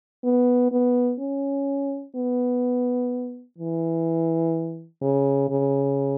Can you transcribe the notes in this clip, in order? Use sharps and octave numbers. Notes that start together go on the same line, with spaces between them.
B3
B3
C#4
B3
E3
C#3
C#3